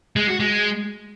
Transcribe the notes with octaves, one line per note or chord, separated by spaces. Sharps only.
G#3
F#4
G#3